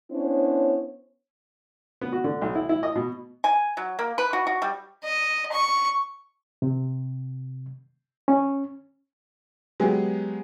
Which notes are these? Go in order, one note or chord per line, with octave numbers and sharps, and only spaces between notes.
B3 C#4 D4 E4 C5 C#5
B3
F#4
D3
B1
E4
E4
D#5
B2
G#5
F#3
A#3
B4
F#4
F#4
G3
D#5
C#6
C3
C#4
F#3 G#3 B3 G4 G#4